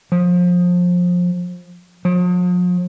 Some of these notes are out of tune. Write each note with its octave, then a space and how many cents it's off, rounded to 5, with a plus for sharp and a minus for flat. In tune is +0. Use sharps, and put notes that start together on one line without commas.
F3 +25
F3 +45